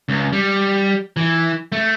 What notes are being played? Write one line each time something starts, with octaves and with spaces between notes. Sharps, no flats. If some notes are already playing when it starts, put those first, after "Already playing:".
C#2
G3
E3
A3